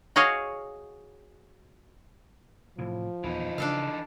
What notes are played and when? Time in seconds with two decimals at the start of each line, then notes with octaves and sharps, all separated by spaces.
0.16 F#4 G#4 C#5 D#5 F5
2.78 A2 C3 E3 F3
3.24 D#1 E2 E3 B3 D#4
3.58 C#3 D4 A4 F5